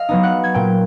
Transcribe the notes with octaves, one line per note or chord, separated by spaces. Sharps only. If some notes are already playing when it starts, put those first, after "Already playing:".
Already playing: D#5 F5 F6
F#3 B3 D#4
F#5 F#6
G#6
A#2 G5 G6